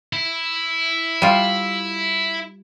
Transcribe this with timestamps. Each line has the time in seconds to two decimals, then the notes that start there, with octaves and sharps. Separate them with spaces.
0.13 E4
1.22 G3 F4